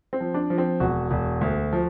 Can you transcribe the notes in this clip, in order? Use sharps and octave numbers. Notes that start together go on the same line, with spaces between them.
C4
F3
D4
F3
C4
E1 F#4
E1
D2
F3